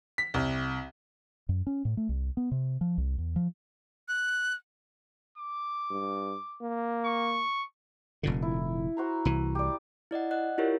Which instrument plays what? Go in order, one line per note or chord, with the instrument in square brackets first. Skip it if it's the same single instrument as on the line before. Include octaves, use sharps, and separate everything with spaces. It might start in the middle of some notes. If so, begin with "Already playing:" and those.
[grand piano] B6
C2
[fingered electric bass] F#2
C#4
A2
A3
C2
B3
C3
F3
C2
E2
F3
[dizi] F#6
[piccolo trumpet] D6
[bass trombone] G2
A#3
[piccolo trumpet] C#6
[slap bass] F1 A#2 D3
[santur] E4
F#4 C5 A#5
[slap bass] C2 E3
[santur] G4 D5
[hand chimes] E4 D5 D#5 F#5
D5 D#5 F#5 F#6
E4 F4 G4 A#4 C#5